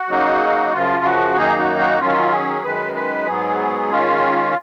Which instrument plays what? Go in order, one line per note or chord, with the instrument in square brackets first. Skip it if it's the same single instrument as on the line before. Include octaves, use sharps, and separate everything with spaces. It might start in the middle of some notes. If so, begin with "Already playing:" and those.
Already playing: [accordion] F#4
C#3 F#3 A#3 D#4
F#2 C#3 F3 F4
F#4
F#2 D#3 A#3 D#4 G#4
F#4
F#4
D#3 F#3 C#4 F4
G#4
F#2 D#3 G#3 B4
B4
G#2 F#3 B3 G#4
D#3 G#3 C#4 F4